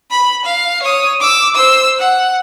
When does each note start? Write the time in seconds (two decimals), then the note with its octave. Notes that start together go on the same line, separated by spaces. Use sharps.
0.11 B5
0.45 F5
0.83 C#5 D#6
1.20 D6 E6
1.55 C5 E6
1.99 F#5